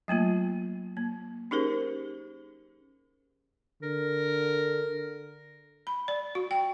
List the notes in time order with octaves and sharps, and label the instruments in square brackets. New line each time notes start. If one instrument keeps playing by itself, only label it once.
[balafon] F#3 A3 A#3 F4
A#3
C#4 D#4 G4 G#4 A#4 C5
[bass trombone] D3 [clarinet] A#4
[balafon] B5
D5
F#4
G5